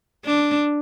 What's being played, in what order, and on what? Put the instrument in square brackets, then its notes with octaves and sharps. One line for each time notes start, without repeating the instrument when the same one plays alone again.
[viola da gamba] D4